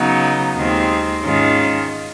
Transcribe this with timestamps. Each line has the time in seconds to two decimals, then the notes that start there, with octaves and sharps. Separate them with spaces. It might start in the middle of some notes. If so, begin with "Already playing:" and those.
Already playing: C#3 F#3 B3 D#4
0.56 D#2 D#3 G#3 C4 F4
1.23 G#2 D#3 G#3 C#4 F4